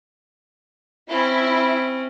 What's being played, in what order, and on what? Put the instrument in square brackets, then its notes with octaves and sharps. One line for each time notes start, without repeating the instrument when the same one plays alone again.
[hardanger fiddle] C4 C#4 [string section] E4